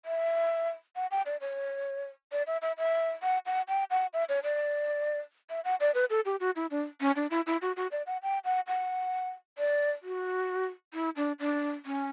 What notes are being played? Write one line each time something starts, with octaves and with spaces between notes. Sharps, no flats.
E5
F#5
G5
D5
C#5
D5
E5
E5
E5
F#5
F#5
G5
F#5
E5
C#5
D5
E5
F#5
D5
B4
A4
G4
F#4
E4
D4
C#4
D4
E4
E4
F#4
F#4
D5
F#5
G5
F#5
F#5
D5
F#4
E4
D4
D4
C#4